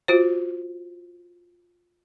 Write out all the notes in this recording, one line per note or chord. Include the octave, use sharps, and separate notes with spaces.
F4 F#4 C5